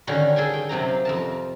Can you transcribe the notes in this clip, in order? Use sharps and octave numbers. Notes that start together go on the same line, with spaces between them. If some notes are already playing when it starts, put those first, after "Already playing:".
D3 D#3 G3 C#4 F#4
G#4 A4 G5 G#5
G5
F#2 C3 F#3 A#5
F5
F2 A#4 A5